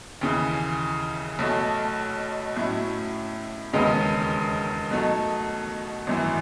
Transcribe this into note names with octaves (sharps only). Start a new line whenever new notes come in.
D#2 C#3 E3
B1 B2 A3
A2 F#3 C#4 E4
E1 D#2 C#3 G#3 B3
B2 F#3 A3 D#4
G#1 F#2 E3